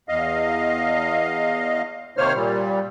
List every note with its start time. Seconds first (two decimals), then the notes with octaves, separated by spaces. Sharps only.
0.09 E2 D#5 F5
2.17 C3 D#3 A#3 C5 C#5 F6
2.35 A#2 G3